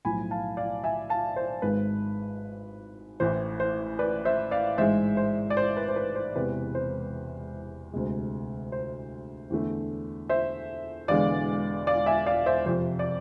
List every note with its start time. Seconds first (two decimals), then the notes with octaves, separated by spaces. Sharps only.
0.05 B1 A2 F3 G#5 B5
0.31 F5 A5
0.57 D5 F5
0.84 E5 G#5
1.10 F5 A5
1.36 C5
1.62 G#1 G#2 G#3 B4
3.20 A1 A2 E3 C5
3.60 C5
3.99 B4 D5
4.25 C5 E5
4.51 D5 F5
4.78 A1 G#2 G#3 C5 E5
5.17 C5
5.50 D5
5.57 C5
5.77 B4
5.88 C5
5.96 B4
6.15 C5
6.36 E1 E2 C3 B4
6.75 C5
7.93 D2 C3 G#3
8.72 C5
9.50 E2 D3 A3
10.29 C5 E5
11.08 E1 E2 D3 G#3 D5 F5
11.87 D5 F5
12.06 E5 G#5
12.26 D5 F5
12.46 C5 E5
12.66 F2 C3 F3 C5
12.99 D5